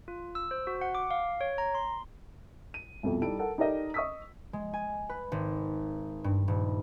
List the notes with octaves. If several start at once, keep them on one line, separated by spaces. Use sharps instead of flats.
F4
E6
C5
F#4
F#5
D6
F5
C#5
A#5
C6
D#7
C2 F2 B2
G3 D#4 E4 A4 D7
A4 A#4 F#5
D#4 G4 A4 A#4 D5 D#5
D#5 C#6 D#6 E6 B6
G#3
G#5
B4
G#1
G2
D#1